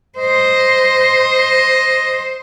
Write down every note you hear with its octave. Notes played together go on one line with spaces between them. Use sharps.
C5 D#5